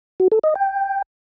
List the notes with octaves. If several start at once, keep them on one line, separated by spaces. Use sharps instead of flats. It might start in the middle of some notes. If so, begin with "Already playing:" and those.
F#4
A4
D#5
G5